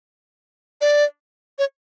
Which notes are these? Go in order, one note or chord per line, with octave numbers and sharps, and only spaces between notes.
D5
C#5